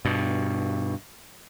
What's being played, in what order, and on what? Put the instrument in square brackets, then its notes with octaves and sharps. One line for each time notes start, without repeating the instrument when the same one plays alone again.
[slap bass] G2 B2